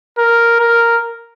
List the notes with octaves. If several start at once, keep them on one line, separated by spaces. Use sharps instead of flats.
A#4
A#4